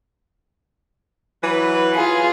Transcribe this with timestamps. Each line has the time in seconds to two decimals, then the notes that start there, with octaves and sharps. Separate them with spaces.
1.42 E3 F#3 B4
1.95 F4 G#4